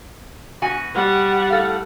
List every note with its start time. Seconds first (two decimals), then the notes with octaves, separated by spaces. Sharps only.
0.62 B2 F#4 G#5
0.95 G3 F#5
1.50 A2 A4 F5